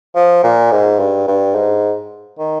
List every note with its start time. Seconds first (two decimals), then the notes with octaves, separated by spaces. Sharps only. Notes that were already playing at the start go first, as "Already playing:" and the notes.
0.15 F3
0.43 A#2
0.71 G#2
0.99 G2
1.27 G2
1.55 G#2
2.39 D#3